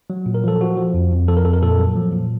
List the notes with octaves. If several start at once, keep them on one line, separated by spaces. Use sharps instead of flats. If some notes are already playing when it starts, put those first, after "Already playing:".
F#3
A#2
A#4
F3 A4
F3 F#4
F3
F2
F2
F3 A4
A#4
F2 A4
A#4
A#2 A4
F#3
F3
A#2